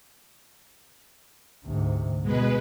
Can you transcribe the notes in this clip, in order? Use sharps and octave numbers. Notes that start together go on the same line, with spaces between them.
D2 G#2 C3
B2 G#3 B4